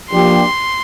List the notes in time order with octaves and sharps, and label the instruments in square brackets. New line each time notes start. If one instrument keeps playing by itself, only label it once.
[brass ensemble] F3 A#3 D4 G4 [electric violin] C6